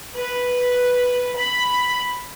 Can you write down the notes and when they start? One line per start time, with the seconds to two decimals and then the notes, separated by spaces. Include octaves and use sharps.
0.15 B4
1.37 B5